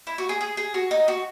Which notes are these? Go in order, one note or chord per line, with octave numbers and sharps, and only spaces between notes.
E4
F#4
G#4
G#4
G#4
F#4
D#4
F#4